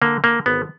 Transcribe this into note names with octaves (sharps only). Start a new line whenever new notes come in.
D3 A#3
D3 A#3
G#1 B3